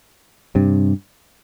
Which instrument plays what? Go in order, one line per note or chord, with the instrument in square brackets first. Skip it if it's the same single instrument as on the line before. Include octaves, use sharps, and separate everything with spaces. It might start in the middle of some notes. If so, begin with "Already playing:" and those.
[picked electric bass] G2 C3